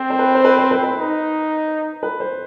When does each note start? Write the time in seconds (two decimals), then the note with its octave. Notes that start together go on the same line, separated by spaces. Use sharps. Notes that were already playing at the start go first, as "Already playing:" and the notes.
Already playing: C4 C5
0.10 C5
0.19 B4
0.35 C5
0.45 B4
0.59 C5
0.71 B4
0.84 B4
0.97 D#4
2.03 B4
2.20 C5